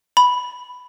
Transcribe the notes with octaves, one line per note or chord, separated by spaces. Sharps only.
B5